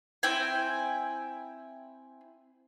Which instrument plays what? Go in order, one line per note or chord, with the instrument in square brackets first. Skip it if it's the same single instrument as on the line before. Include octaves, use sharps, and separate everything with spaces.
[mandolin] C4 E4 G5 G#5